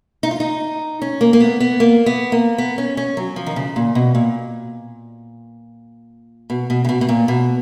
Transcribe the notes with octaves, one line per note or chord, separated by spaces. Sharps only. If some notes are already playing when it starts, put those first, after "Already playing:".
D#4
F4
D#4
C#4
A#3
A#3
B3
B3
A#3
B3
A#3
B3
C#4
C#4
F#3
F3
D#3
C#3
A#2
B2
A#2
B2
B2
C#3
B2
B2
A#2
B2